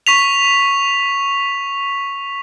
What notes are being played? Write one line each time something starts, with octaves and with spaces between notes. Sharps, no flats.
C#6 B6 F7